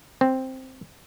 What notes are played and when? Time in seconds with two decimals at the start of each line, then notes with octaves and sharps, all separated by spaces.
0.21 C4